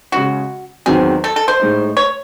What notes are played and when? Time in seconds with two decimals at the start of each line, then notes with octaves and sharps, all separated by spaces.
0.12 C#3 G#3 C#4 F#4
0.86 E2 D#3 F#3 C4 G#4
1.24 A4
1.36 A4
1.48 C5
1.60 A2 G#3 D#4
1.97 C#5